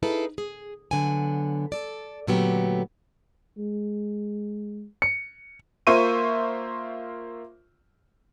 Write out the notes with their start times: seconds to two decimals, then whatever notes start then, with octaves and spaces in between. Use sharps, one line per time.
0.03 D#4 E4 G#4 A4 B4 F5
0.38 G#4
0.91 D3 F#3 B3 G#5
1.72 A4 D5
2.27 A#2 D3 F#3 A3 B3 G4
3.58 G#3
5.02 C#7
5.87 A#3 F4 C5 E5 C#6 D#7